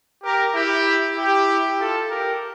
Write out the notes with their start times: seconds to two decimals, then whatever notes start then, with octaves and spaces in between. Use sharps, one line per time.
0.23 G4 A#4
0.54 E4 G4
1.16 E4 G4
1.78 F4 A4
2.09 G4 A#4